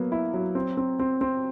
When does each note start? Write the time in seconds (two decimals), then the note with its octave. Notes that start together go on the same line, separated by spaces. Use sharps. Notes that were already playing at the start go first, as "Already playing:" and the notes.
Already playing: F#3 A#3 B3
0.12 E4
0.34 F#3
0.55 C4
0.77 C4
0.99 C4
1.21 C4